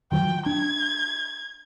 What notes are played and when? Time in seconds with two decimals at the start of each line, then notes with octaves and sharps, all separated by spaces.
0.12 D#3 F3 F#3 G5
0.46 D4 G#6